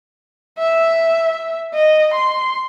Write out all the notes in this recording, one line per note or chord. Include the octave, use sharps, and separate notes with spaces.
E5
D#5
C6